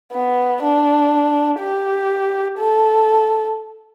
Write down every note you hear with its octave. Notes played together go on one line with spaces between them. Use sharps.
B3
D4
G4
A4